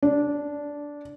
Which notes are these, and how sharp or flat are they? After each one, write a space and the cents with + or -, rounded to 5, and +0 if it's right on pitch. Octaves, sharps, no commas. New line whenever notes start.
D4 -10